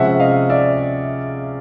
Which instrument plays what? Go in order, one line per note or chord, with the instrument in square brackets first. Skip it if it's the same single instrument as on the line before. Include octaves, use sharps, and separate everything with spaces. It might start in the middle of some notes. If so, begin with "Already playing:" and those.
Already playing: [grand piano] C3 F3 G#3 C#4 E5 F#5
D#5 F5
D5 E5